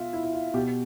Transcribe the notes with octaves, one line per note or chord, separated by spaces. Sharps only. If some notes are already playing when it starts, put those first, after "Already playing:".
Already playing: B2 F4 E5
E4
E4
F4
B2 G4